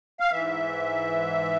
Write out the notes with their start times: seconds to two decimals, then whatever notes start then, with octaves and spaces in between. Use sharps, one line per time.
0.20 F5
0.32 G#2 E3 E5